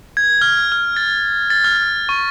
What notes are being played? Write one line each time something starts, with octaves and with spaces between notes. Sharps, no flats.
G#6
F6
F6
A6
A6
F6
C#6